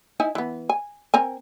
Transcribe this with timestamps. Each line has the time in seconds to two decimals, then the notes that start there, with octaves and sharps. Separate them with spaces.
0.20 D#4 E4 G#5
0.35 E3 B3
0.69 G#5
1.14 C4 A#4 G#5